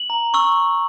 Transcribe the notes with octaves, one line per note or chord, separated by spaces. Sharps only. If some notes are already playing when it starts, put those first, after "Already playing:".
Already playing: F#7
A#5
C#6 E6